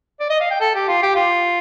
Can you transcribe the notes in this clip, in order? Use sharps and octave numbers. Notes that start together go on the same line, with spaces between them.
D5
D#5
F5
G5
A4
G4
F4
G4
F4